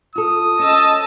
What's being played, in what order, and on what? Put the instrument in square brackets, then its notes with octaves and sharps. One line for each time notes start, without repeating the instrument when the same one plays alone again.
[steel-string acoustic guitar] F4 A4 [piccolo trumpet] D#6
[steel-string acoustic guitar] C#4 [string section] D#5 A5 E6